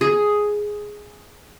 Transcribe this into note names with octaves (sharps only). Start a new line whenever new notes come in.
G#4